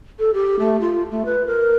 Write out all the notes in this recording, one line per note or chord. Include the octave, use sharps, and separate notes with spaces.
A4
G4
A3
F4
A3
B4
A#4